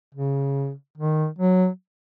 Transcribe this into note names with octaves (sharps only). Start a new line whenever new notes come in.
C#3
D#3
F#3